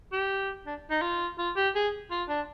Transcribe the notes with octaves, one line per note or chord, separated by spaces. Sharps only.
G4
D4
D#4
F4
F4
G4
G#4
F4
D4